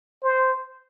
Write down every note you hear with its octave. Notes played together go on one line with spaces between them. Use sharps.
C5